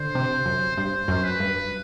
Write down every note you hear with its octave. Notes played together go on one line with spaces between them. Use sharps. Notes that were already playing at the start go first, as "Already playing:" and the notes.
Already playing: D3 C5
C3
F#2
G2 C5
F#2
B4
G2